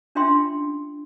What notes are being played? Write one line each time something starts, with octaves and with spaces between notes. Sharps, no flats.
C#4 D4 F4 E5 G5 C6